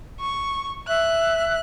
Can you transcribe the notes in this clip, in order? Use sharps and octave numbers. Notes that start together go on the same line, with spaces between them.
C#6
E5 F#6